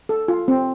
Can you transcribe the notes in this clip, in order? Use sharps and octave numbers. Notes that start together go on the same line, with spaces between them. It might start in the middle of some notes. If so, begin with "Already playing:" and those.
A4
F4
C4